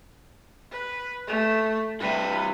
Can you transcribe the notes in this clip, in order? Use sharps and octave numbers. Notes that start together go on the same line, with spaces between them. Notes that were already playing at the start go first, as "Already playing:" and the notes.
B4
A3
G2 C3 B4